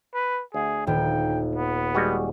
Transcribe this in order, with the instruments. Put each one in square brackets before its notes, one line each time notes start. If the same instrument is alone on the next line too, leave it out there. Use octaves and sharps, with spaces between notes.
[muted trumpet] B4
[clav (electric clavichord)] D2 [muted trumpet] G#4
[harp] D#1 [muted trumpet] G5
[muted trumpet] B3
[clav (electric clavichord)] G3 G#3 F#4